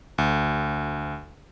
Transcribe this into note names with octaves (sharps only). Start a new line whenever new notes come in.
D2